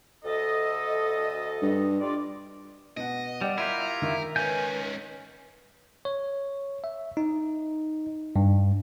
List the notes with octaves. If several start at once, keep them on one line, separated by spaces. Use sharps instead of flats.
D2 A4 D#5
G2
G3 F4 D5
B2 D#5 F#5
G3 D5 F#5 G5 D6
E4 F4 G4 A#4 E5
D#3 E5
G#2 C#4 B4 G#5 G6
C#5
E5
D#4
G2